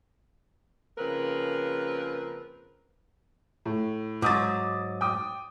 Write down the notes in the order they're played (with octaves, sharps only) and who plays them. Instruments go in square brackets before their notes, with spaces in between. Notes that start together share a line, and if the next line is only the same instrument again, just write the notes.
[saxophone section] C#3 F3 A#3 C4 A#4 B4
[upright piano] A2
[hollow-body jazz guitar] G#2 F#3 [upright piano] D6 D#6 A6
[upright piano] G5 D6 D#6